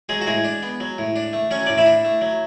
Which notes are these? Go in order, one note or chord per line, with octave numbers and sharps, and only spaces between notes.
F#3 G#3 G#4
F#4
A2 G#3 G#4
D4
B3
F#3
A2
D4
A3
F#3 C#4 C#5
A2 D5
E4 E5
D4
A3
F#3